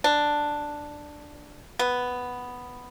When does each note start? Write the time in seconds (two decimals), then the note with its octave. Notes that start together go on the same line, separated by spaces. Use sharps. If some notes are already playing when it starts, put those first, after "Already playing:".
0.04 D4
1.79 B3